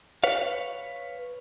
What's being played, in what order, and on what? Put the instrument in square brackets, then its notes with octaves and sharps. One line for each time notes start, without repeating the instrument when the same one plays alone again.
[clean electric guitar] B4 C#5 F5